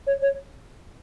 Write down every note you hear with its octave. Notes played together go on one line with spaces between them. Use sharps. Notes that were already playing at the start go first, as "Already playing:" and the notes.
C#5
C#5